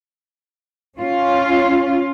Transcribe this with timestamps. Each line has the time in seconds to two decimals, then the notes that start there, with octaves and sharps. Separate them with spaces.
0.99 C#4 F4